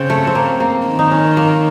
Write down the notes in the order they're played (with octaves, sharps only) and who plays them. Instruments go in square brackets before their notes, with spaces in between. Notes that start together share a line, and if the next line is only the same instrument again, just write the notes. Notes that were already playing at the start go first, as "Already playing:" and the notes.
Already playing: [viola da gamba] C#3 [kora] C4
[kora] A3
C4
A#3
A#3
[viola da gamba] D#3
[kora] D#4
C#4
A#3